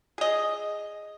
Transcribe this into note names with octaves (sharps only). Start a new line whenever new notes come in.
G#4 D#5